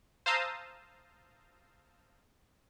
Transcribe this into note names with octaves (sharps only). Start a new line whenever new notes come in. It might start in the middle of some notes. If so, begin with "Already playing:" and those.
C5 F5 A5 A#5 D#6 E6